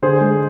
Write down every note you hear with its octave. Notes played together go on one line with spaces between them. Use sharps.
D3 G#4 C5
G#3